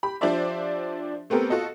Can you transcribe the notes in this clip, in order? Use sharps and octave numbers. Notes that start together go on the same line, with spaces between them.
G4 B5
F3 D4 G4 C5 D5 E5
A3 B3 C4 G4 A4 A#4
F4 F#4 A4 D#5